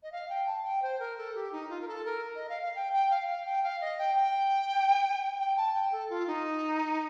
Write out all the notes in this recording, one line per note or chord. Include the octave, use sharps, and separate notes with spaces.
D#5
F5
G5
A5
G5
C5
A#4
A4
G4
D#4
F4
A#4
A4
A#4
D#5
F5
F5
G5
G5
F5
F5
G5
F5
D#5
G5
G5
G5
A5
G5
A4
F4
D#4